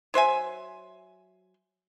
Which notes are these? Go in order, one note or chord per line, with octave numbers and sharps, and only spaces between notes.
F#3 C5 E5 G#5